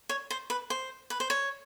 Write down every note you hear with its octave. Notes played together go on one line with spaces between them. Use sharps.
C#5
C5
B4
C5
B4
C5
C#5